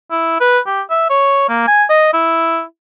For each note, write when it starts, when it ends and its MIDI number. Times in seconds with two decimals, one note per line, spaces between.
0.11 0.37 64
0.40 0.59 71
0.66 0.82 67
0.90 1.06 76
1.10 1.48 73
1.49 1.67 58
1.67 1.84 80
1.90 2.13 75
2.13 2.63 64